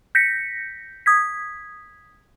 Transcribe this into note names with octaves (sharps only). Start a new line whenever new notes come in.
G6 A#6 B6 C#7
D#6 G#6 B6